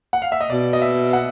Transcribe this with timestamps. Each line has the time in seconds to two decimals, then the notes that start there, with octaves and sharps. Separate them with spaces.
0.13 F#5
0.22 F5
0.32 E5
0.41 D#5
0.50 B2 D5
0.73 D#5
0.82 E5
1.13 F#5